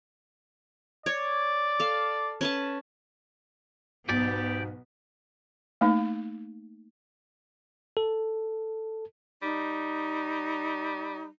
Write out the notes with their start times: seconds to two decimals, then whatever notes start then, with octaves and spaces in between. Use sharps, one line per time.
1.06 C#5 D5
1.80 A4 F5
2.41 C#4 B4 A5
4.09 B1 G#2 B2 B3 G4 D5
5.81 A3 A#3 D#4
7.97 A4
9.42 G3 D#4